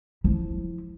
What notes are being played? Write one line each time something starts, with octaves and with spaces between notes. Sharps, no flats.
F3 E4